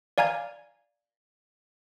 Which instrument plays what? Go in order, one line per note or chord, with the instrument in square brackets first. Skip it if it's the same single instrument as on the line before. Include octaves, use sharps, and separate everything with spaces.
[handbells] D5 F5 G#5 A#5 G#6